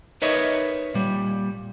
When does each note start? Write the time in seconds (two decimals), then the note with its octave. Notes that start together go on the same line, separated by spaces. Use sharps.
0.22 D#4 A#4 B4 C#5 D#5 E5
0.94 A#2 G3